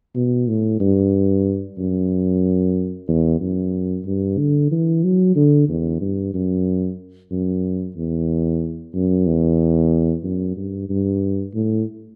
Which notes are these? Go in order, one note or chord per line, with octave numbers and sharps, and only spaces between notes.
B2
A2
G2
F#2
E2
F#2
G2
D3
E3
F#3
D3
E2
G2
F#2
F#2
E2
F#2
E2
F#2
G2
G2
A2